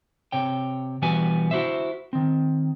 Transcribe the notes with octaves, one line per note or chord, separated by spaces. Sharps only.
C3 C#5 G5
B2 E3 G3 F#4 B4 G#5
E4 F#4 C5 E5
D#3 C4